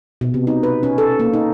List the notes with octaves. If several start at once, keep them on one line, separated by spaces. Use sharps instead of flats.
B2
C3
D#4
B4
C#4
A4
A#3
D#4